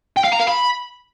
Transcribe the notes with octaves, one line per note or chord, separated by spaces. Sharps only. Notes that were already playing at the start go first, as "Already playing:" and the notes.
G5
F5
A#5
F5
B5